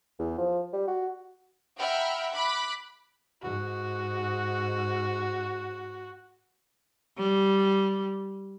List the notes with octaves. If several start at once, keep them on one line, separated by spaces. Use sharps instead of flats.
E2
F3
G3
F#4
E5 F#5 G5 A#5 B5 F6
B5 D6 F#6 B6
G#2 F#4
G3